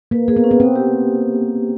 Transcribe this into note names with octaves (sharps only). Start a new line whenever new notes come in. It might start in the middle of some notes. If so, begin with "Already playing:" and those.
A#3 B4
A#3 G#4
B3
C#4
B3
A#3 C4
G4